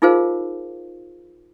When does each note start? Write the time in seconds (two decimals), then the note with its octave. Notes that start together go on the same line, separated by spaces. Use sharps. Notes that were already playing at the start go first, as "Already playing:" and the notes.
0.02 D#4 F4 G#4 A#4 C5 F5